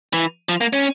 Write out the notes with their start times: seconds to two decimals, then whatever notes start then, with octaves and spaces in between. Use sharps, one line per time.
0.14 E3
0.49 F3
0.61 A#3
0.73 C#4